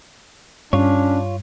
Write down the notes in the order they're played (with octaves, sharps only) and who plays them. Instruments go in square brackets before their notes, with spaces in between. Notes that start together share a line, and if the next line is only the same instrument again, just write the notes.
[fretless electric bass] G2 [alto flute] C#4 [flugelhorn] D4 [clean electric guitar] F4 C#5